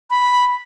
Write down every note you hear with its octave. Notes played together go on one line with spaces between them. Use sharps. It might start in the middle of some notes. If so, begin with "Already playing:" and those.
B5